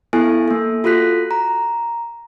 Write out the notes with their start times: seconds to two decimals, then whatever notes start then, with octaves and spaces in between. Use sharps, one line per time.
0.13 B3 E4 A4 G#5
0.48 A#3 A4
0.84 F4 F#4 A4 F#6 B6
1.31 A#5